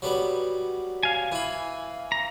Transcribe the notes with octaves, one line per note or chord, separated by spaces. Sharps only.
F#3 G3 B3
F5 G#5
E3 B5
A#5